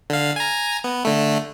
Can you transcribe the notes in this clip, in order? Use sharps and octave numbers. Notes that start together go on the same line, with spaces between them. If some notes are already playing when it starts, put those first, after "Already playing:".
D3 F5
G#5 A#5
B3
D3 A3